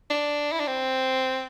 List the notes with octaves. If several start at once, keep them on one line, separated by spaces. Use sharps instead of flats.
D4
E4
D4
C4